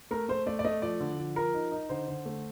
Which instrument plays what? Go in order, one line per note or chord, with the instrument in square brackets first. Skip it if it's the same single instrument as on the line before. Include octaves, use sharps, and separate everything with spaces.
[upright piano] A3 A#4
A3 C5
A3 D5
D5
A3 D#5
F3 D5
D3
F3
F3 A#4
D#4
D#4
D3 C5
D3
A3